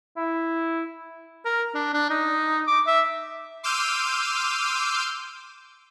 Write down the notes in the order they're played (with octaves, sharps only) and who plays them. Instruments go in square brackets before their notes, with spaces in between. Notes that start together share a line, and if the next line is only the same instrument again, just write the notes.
[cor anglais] E4
[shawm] A#4
D4
D4
D#4
D6
E5
[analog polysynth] C6 D6 E6 F6 G6 D#7